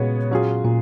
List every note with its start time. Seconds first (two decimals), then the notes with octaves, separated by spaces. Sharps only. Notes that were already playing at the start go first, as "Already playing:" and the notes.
Already playing: A#2 C#3 G#3 B3 F#4 C#5
0.31 F#3 C#4 F4 G#4
0.64 A#2